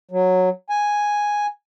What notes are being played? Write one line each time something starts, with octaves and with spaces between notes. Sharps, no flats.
F#3
G#5